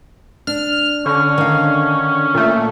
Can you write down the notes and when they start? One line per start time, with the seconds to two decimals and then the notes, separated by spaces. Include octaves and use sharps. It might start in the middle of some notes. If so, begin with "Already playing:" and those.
0.47 D4 F6
1.06 D3 C#4
1.38 D#3 F5
2.34 A#2 A3